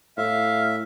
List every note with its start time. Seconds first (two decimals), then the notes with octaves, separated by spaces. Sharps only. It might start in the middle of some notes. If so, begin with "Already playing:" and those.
0.18 A2 E5 F5